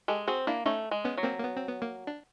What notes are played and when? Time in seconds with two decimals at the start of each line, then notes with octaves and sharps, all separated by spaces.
0.08 G#3 G4 A4
0.27 C4 F#4 G#4
0.47 A#3 D4 E4
0.66 A3 C#4 D#4
0.91 G#3
1.04 B3 C#4
1.17 F#3
1.23 A#3 C4
1.38 A#3
1.43 B3
1.56 C4
1.68 B3
1.82 A#3
2.07 D4